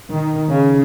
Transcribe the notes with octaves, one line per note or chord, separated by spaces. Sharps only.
D#3
C#3